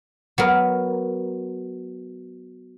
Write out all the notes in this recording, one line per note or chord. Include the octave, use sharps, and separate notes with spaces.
F#3 B3 A#4